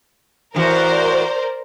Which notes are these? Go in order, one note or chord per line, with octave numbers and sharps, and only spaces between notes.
A2 E3 F#4 A#4 C5 D5